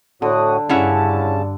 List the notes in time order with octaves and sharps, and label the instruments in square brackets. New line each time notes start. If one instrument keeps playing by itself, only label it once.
[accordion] A2 F#4 D#6 [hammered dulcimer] D3
[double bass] G2 [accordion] C#3 A5 [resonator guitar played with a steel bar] C#4 E4 F#5